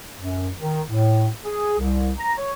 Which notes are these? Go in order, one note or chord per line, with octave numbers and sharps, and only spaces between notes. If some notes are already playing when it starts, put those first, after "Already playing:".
F#2
D#3
A2
G#4
C2
A#5
C#5